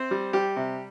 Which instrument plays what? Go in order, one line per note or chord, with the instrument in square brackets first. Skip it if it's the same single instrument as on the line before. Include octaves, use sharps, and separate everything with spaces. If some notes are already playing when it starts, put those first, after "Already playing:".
Already playing: [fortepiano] C4 C5
G3
G3 G4
C3